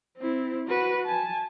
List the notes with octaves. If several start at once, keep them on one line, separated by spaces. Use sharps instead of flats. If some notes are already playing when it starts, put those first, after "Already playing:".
C4 E4
F#4 B4
G#5 A5